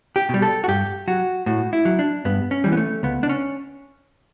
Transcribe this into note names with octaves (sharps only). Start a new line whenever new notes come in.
G4
B2 G3
A4
F#4
G2 G4
F#3 F#4
A2 F#4
E4
F#3
D4
G2 B3
C#4
E3 G3
B3
A3
C#2 B3
D4
C#4